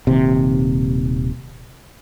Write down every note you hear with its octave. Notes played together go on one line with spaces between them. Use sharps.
D#1 D#2 C3